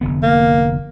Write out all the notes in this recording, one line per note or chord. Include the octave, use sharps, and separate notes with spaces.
F1 D3 B3
A#3